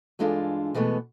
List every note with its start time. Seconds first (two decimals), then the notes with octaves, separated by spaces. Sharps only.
0.19 G2 E3 G#3 D4 F4 A4
0.74 B2 E3 G#3 A3 B3